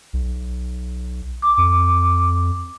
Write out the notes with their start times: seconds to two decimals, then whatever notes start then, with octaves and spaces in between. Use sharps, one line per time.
0.13 B1
1.42 D6
1.58 F2